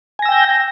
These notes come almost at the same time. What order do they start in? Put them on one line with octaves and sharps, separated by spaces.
G#5 A#6 E6 G5 G6